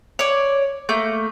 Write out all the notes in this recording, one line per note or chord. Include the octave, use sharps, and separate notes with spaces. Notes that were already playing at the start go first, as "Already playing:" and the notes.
C#5 D5
A3 A#3 G6